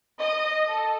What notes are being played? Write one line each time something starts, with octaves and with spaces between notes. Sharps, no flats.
D#5
A4